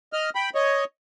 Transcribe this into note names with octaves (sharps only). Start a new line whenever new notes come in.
D#5 F6
G5 B5
C#5 D#5